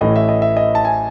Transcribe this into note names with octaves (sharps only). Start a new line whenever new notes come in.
A1 A2 E3 D#5
E5
D#5
E5
D#5
A5
G#5